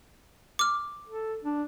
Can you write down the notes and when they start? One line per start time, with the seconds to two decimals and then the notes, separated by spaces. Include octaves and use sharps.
0.59 D6 F6
1.08 A4
1.43 D4